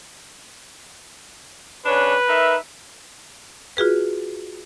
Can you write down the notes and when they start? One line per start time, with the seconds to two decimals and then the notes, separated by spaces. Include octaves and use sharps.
1.86 C#3 D4 B4 C#5
2.29 D#4 A#4 E5
3.77 F4 F#4 G#4 B4